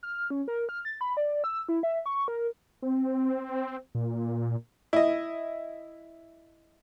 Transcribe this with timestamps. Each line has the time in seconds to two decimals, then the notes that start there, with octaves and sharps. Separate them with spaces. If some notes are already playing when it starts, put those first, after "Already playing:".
0.03 F6
0.30 C#4
0.48 A#4
0.69 F6
0.85 A6
1.01 B5
1.17 D5
1.44 E6
1.69 E4
1.83 E5
2.06 C#6
2.28 A#4
2.82 C4
3.95 A#2
4.93 E4 D#5